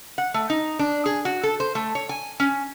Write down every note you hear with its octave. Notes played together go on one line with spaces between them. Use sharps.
F#5
A3
D#4
D4
G#4
F#4
A4
C5
A3
C#5
G#5
C#4